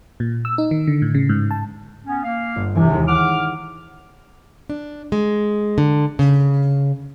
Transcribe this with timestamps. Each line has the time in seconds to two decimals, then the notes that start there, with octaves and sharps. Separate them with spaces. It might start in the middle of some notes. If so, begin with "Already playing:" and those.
0.20 A#2
0.45 E6
0.58 D#4
0.71 D#3
0.87 D3
1.02 A2
1.15 C#3
1.29 G#2
1.51 A5
2.06 B3 C#4
2.24 A#3 F5
2.56 G1
2.75 E1 C3 E3 G#5
2.90 D#2 E3 G#3
3.08 E4 F#5 D6 F6
4.70 D4
5.12 G#3
5.78 D3
6.19 C#3